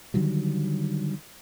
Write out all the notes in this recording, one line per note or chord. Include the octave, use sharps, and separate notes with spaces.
D3 D#3 F#3 G3